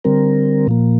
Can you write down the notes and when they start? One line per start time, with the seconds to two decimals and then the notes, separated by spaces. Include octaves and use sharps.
0.04 D3 G3 C4 A#4
0.67 A#2 F3 A#3